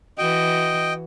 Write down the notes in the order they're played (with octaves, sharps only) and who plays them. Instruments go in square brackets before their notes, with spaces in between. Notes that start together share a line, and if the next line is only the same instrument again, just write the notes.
[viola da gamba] E3 F#4 [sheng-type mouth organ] D#5 G5